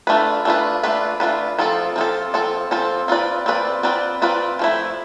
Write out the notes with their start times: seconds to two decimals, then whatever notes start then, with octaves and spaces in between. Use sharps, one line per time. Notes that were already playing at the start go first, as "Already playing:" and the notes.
0.07 A3 D4 F4 B4
0.45 A3 D4 F4 B4
0.83 A3 D4 F4 B4
1.20 A3 D4 F4 B4
1.59 F3 C4 F4 A4
1.96 F3 C4 F4 A4
2.34 F3 C4 F4 A4
2.71 F3 C4 F4 A4
3.08 C4 F4 B4 D5
3.46 C4 F4 B4 D5
3.83 C4 F4 B4 D5
4.22 C4 F4 B4 D5
4.59 F3 A3 E4